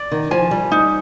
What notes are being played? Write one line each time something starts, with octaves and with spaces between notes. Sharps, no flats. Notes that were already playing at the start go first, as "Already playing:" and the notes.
Already playing: D5
D#3
F3 G#5
G3
D#4